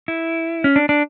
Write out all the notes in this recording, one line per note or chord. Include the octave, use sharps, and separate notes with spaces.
E4
C#4
D4
D4